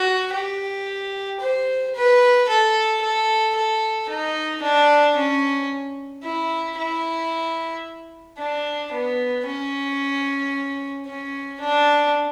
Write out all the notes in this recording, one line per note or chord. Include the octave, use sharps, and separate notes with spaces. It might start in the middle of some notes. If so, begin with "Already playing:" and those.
Already playing: F#4
G4
C5
B4
A4
A4
A4
D#4
D4
C#4
E4
E4
D4
B3
C#4
C#4
D4